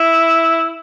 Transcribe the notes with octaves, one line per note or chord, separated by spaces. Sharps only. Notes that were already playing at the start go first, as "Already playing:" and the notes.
Already playing: E4